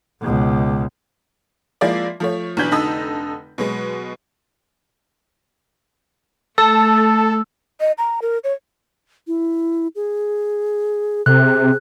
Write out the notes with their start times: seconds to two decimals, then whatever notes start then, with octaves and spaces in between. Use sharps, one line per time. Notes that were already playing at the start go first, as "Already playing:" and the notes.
0.21 C#2 B2
1.81 F3 G#3 A#3 E4 D5
2.20 F3 A3 C#5
2.57 B1 E3 D4 G6 B6 F#7
2.71 F1 D3 D#4 D#5 A5 E6
3.58 B2 F#3 G#3
6.58 A3 A4 A5 E6
7.80 D#5
7.98 A#5
8.22 A#4
8.44 C#5
9.27 E4
9.96 G#4
11.26 C3 A4 F#6
11.44 G#4